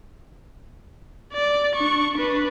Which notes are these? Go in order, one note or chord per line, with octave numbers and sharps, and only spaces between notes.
D5
D4 C#6
D4 B4